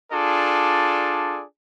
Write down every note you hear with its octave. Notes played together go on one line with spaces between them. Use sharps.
D4 F4 G#4 A4 D5